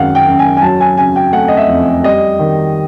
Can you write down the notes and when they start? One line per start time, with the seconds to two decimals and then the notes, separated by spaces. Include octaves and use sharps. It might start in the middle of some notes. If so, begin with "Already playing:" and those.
Already playing: F#2 D#3 G#3 F5 F#5
0.15 G5
0.27 F#2
0.39 G#5
0.57 G#5
0.62 F#3 A5
0.80 G#5
0.97 C#3 G#5
1.16 G5
1.32 A3 F#5
1.48 D#5
1.57 E5
1.69 F2
2.03 G3 D#5
2.39 D#3